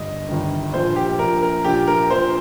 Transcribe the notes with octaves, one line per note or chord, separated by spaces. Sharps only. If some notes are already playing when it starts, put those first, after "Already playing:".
Already playing: G1 G2 D#5
G1 G2 D#3
A#1 A#2 C5
G4
A#1 A#2 A#4
A#4
A#1 A#2 G4
A#4
A#1 A#2 C5